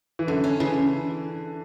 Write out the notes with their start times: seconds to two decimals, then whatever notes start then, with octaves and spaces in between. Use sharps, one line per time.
0.19 E3
0.27 F#2 D3
0.44 C#4
0.60 C#3 E3